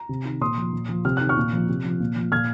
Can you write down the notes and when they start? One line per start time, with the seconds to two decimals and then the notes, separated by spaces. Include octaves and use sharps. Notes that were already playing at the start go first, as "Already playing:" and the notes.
Already playing: A#5
0.09 C3
0.25 D#3
0.41 A#2 C6 D#6
0.57 F3
0.73 A#2
0.89 F3
1.05 C3 F6
1.17 D#3 F#6
1.29 C#6 F6
1.36 A#2
1.53 F3
1.69 C3
1.84 F3
2.00 A#2
2.16 F3
2.32 A#2 F6 G#6